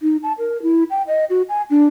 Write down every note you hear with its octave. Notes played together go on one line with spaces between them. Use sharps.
D#4
A5
A#4
E4
G5
D#5
F#4
G#5
D4